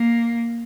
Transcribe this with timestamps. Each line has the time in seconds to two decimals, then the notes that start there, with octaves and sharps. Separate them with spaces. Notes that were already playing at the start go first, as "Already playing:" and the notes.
Already playing: A#3